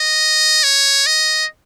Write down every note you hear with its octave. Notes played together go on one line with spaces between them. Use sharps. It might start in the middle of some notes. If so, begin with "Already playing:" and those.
Already playing: D#5
C#5
D#5